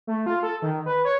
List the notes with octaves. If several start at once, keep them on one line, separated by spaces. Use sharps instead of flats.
A3
F4
A4
D#3
B4
C#5